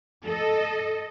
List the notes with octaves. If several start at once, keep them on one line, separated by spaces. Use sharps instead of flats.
A4 D#5